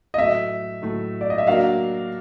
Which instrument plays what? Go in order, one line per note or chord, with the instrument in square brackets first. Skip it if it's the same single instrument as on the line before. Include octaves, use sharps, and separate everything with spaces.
[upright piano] D#5
[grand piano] A2 F#3 A3 [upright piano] E5
[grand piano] A2 F#3 A3
[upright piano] D5
D#5
E5
[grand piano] F#3 A#3 D4 F#4 A#4 [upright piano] F5